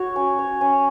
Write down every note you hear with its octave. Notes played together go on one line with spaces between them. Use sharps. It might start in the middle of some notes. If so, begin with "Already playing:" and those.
Already playing: F#4 C#5
C#4
C#5
C#4